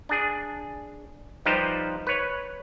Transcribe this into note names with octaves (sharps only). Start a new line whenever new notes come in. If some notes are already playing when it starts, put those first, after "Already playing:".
D4 G#4
F3 G3 D#4 G4 B4 C5
B4 C#5